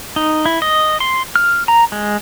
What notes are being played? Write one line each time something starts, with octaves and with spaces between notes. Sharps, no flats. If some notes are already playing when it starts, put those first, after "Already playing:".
D#4
E4
D#5
C6
F6
A#5
G#3